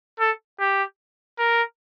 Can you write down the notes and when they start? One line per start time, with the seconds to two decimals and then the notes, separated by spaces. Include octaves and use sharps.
0.19 A4
0.60 G4
1.39 A#4